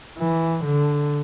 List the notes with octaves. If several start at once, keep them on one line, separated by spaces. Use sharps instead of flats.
E3
D3